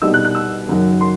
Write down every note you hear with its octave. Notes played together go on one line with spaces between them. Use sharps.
C2 B2 G3 D#4 E6
F#6
F#6
E6
F#1 F#2 D#3 F#3
C6